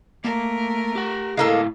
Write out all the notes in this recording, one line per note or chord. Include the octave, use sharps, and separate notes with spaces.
A3 A#3 A#4
G4 F#5
A2 G#3 A#3 E4 A4 F5